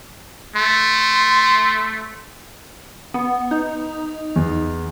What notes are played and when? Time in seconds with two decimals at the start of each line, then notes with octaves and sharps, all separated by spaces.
0.56 A3 C6
3.14 B3
3.51 D#4
4.36 E2